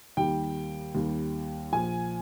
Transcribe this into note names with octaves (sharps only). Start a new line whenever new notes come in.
D#2 D#3 G3 G5
D#2 D#3 G3
A#1 A#2 F3 G#5